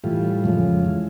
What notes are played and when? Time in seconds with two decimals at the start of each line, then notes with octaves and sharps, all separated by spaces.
0.04 A2 E3 G3 F4
0.44 F2 C#3 F3 G#3
0.85 E3 G#3